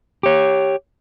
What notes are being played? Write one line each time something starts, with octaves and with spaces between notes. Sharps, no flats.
G4 C#5